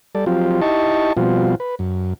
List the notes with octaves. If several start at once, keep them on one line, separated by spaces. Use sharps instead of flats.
G3 A4 D5
F3 F#3 C4 F4 G4
D#4 E4 G4 D#5 A5 C#6
B2 F3 G3 C4 F4 F#4
B4
F#2